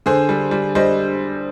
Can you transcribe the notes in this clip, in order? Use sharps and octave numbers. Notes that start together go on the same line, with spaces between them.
D3 G#4 C5
G3
G3
G3 C5 D#5